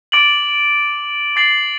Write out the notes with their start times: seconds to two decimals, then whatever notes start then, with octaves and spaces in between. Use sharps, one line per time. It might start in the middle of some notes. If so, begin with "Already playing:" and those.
0.12 D6 A6 D7 F#7
1.36 D6 A6 C7 F#7